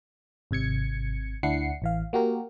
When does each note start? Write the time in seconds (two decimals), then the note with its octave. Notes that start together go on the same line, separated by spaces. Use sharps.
0.51 G#1 C3 G#6 C#7
1.43 D2 D4 E4 F#5 C7 C#7
1.82 A1 E3 F5
2.13 A#3 F#4 G4 A#4